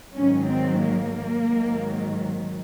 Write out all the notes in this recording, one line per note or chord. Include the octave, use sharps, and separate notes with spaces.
G#2 D#3 F#3 C#4
C4
A#3
G#2 D#3 F#3